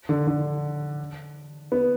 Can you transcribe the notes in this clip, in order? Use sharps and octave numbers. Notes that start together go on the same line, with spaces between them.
D3
D3
B3